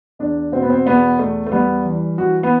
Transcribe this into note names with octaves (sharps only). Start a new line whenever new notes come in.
E2 D4
B2 C4
B3
C4
E2 B3
E2 A3
A3
G3 B3
E3
E3 F#4
B3